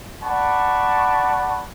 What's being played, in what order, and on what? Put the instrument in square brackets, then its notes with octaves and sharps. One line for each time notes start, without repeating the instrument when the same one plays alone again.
[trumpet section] D5 F#5 A5 B5 C#6